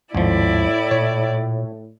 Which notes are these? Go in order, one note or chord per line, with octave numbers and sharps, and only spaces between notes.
G#1 D#2 A2 F3 E4 D5
A#2 C#5